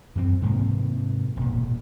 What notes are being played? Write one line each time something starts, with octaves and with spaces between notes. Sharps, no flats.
F#2 E3 C4
G#2 C3 G#3 A#3
E1 A#2